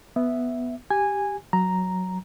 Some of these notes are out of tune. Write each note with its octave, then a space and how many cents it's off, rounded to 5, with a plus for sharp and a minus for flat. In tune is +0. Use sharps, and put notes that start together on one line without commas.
B3 +0 E5 +0
G4 +0 G#5 -10
F#3 +0 A#5 +0